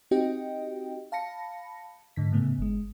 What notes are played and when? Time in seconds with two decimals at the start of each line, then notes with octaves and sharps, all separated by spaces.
0.11 C4 D#4 F#4 G4 D#5 G5
1.12 F5 A5 B5 A#6 C#7
2.16 G#2 D3 B6
2.32 A2 C#3 A3 B3
2.59 G1 G#3